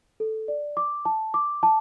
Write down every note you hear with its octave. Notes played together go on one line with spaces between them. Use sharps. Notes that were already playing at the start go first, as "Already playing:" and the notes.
A4
D5
D6
A5
D6
A5